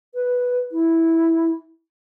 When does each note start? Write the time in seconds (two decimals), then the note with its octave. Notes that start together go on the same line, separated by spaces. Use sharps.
0.14 B4
0.72 E4